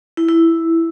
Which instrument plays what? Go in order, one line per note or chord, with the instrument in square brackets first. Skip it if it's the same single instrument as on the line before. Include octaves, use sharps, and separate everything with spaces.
[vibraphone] E4
E4